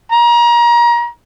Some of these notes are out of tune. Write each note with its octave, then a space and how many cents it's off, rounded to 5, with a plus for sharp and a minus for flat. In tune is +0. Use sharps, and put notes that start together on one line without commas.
A#5 +30